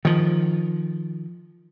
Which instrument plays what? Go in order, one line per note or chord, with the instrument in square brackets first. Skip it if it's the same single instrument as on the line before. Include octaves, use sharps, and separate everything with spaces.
[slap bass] D#3 F3